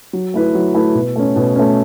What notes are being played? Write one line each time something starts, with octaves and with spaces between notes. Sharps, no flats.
F#3
A3 E4 B4
F#3
A3 E4 B4
B2
A3 C#4
B2
A3 C#4